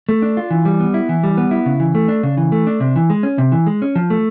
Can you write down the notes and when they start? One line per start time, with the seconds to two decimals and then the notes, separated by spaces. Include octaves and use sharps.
0.09 A3
0.22 D4
0.37 F4
0.51 E3
0.65 G3
0.80 B3
0.94 E4
1.09 E3
1.23 G3
1.37 B3
1.51 E4
1.66 C#3
1.80 E3
1.95 A3
2.08 D4
2.23 C#3
2.37 E3
2.52 A3
2.67 D4
2.80 C3
2.96 E3
3.10 G#3
3.23 C#4
3.38 C3
3.52 E3
3.66 G#3
3.82 C#4
3.96 F3
4.10 A3